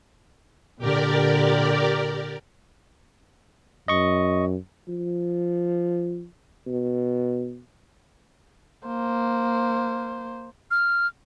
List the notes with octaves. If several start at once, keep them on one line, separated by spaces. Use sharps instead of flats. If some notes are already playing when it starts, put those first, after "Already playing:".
A#2 D3 G4 A#4 D5
F#2 D#5 C#6
F3
B2
A#3 C5
F6